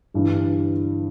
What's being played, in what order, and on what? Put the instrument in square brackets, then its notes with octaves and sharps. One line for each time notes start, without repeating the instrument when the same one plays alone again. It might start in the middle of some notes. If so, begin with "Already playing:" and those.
[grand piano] G1 G2 E3